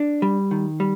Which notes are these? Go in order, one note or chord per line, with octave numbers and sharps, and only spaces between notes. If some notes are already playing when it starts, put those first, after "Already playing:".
Already playing: D4
G3
D#3
G3